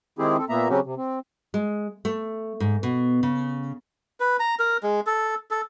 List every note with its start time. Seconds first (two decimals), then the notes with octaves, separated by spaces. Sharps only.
0.19 D#3 G#3 C4 E4 G4 G#4
0.38 C4 A4
0.49 A#2 A#3 B3 E5 A#5
0.69 C#3 F#3 C4 C#4 F#4 G4
0.85 C3
0.97 C4
1.54 G#3
2.05 A3
2.60 G#2
2.83 B2
3.23 C#3
4.20 B4
4.40 A#5
4.59 A#4
4.83 G#3
5.07 A4
5.51 A4